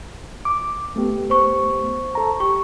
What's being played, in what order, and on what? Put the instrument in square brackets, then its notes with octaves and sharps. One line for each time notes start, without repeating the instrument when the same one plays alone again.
[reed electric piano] D6
A3 B3 G4
[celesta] C5 C#6
[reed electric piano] A4 A#5
[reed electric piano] G4 [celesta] C#6